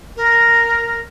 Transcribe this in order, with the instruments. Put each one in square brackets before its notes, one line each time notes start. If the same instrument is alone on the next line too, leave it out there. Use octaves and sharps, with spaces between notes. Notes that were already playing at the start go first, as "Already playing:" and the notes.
[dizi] A#4